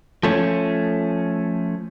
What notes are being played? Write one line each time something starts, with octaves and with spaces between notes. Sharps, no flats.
F3 A3 C#4